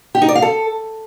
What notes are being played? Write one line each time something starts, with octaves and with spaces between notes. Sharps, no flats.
G4
D#4
D5
F5
A4